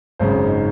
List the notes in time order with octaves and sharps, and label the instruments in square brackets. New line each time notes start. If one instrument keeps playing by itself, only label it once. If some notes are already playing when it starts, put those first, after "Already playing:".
[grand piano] G#1 F#2 C#3 C5
D#4